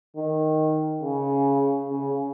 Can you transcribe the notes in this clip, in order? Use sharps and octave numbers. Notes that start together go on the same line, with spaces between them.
D#3
C#3
C#3